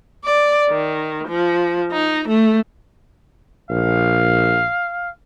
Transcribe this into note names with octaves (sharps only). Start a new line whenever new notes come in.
D5
D#3
F3
D#4
A3
A#1 F5